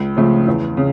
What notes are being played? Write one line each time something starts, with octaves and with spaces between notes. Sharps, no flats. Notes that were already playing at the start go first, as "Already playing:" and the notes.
Already playing: C#2
C#3 F3 A3 C#4
E2
C#3